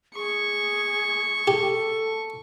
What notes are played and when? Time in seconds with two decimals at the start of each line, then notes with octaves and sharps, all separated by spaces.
0.15 G#4 C#6
1.47 G4 A4